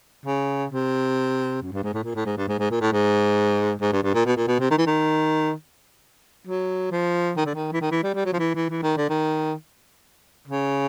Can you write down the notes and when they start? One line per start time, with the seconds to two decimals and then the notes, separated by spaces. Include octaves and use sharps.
0.26 C#3
0.71 C3
1.62 F#2
1.73 G2
1.83 G#2
1.94 A2
2.04 A#2
2.15 A2
2.26 G#2
2.37 G2
2.48 G#2
2.59 G#2
2.71 A#2
2.81 A2
2.93 G#2
3.81 G#2
3.92 G2
4.03 G2
4.14 A#2
4.26 B2
4.37 A#2
4.48 B2
4.60 C3
4.71 D#3
4.78 E3
4.87 D#3
6.48 F#3
6.92 F3
7.37 D#3
7.46 D3
7.55 D#3
7.73 E3
7.81 D#3
7.91 E3
8.04 G3
8.15 G3
8.26 F#3
8.33 F3
8.39 E3
8.55 E3
8.70 E3
8.83 D#3
8.97 D3
9.09 D#3
10.48 C#3